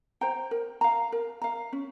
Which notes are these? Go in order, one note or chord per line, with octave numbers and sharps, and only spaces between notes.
C5 G5 A#5
A#4
F5 A#5
A#4
F5 A#5
C#4